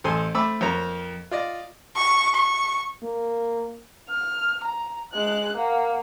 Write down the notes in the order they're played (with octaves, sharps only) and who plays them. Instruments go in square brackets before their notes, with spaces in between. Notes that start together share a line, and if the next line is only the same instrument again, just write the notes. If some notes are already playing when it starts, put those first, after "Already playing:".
[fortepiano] A1 A4 C5 G#5 C6
A3 C4 B5 D6 E6
F2 A#3 C5 C#5 A#5
F4 D5 D#5
[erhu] C#6
C#6
[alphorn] A#3
[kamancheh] F6
A#5
G#3 F#6
A#3 F#5